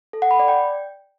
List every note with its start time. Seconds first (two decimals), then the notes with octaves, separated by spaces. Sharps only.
0.13 A4
0.22 F#5
0.31 B5
0.39 D5
0.48 G5